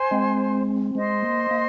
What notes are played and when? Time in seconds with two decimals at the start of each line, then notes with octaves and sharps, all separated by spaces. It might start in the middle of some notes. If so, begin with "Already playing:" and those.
Already playing: C5 G#5 C6
0.11 G#3 C4
0.95 G#3 C5 D#5 C6
1.22 A#3
1.51 A#3